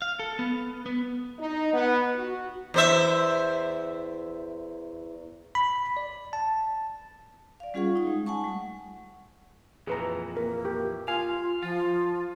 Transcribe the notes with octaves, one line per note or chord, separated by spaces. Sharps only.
F5
A4
B3
B3
D#4
B3
F#4
E2 C5 E5
B5
D5
A5
D5 F5
G3 C#4 F4 G#4 F#5 C#6
D#4 D#6
G#3
F#5 G#5 A5 C#6
G3 A3
F2 A#2 E3 G#4 B4 A#5
A#3 A#4
G4
F4 F5 G#5
F3 F4